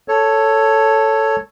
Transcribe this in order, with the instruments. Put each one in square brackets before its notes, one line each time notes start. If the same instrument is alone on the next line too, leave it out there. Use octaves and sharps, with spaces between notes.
[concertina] A4 C#5